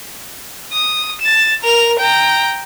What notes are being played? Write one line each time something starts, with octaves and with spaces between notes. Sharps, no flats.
D#6
A6 E7
A#4 F7
G5 A#5